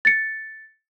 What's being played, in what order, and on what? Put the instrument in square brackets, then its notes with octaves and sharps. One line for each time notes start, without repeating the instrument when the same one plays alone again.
[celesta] A6 C#7